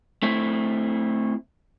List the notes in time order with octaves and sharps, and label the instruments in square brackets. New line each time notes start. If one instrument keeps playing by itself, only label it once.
[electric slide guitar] A3 C4 E4